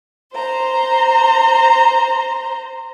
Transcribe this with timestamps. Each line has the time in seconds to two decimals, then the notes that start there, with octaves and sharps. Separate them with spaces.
0.33 C5 A#5